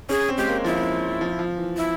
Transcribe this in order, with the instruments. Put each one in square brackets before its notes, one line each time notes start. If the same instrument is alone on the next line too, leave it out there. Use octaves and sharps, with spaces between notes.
[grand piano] C#4 [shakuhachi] G#4
[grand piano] C4
[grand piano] G#3 [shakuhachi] G4
[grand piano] A#3
[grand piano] F3 [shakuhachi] E4
[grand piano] F3
F3
E3
[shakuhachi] E4